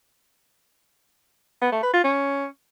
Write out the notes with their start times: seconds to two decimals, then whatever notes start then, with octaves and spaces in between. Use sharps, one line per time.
1.61 B3
1.72 A3
1.83 B4
1.93 F4
2.04 C#4